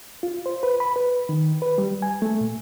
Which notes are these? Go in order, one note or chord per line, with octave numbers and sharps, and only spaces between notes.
F4
C5
B4
B5
B4
D#3
B4
G3
G#5
A3
A#2